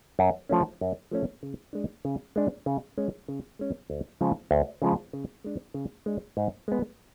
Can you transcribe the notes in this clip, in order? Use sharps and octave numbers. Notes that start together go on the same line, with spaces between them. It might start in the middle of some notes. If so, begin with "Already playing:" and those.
F#2
F3 A3 C#4
F#2
F3 A3 C#4
C#3
G#3 D4
C#3
G#3 D4
C#3
G#3 C#4
C#3
G#3 C#4
D2
C#3 F3 G#3
D2
C#3 F3 G#3
C#3
G#3 D4
C#3
G#3 D4
G#2
G#3 B3